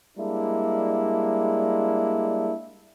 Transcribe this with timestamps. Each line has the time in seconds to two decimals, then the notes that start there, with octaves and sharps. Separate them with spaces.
0.18 G3 G#3 A#3 D4 E4